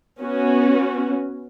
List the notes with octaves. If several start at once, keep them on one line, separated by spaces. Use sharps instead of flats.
B3 C#4 F#4